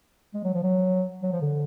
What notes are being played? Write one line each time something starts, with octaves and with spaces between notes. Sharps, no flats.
G#3
F#3
F3
F#3
F#3
F3
D3